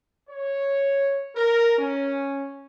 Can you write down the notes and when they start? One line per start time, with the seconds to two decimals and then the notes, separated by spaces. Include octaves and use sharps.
0.29 C#5
1.35 A#4
1.78 C#4